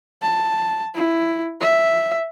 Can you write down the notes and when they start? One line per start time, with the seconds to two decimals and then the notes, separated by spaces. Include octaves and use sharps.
0.23 A5
0.95 E4
1.61 E5